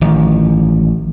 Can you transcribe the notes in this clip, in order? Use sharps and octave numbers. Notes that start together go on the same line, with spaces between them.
A1 D#3 F3